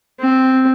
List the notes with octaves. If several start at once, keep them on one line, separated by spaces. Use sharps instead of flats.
C4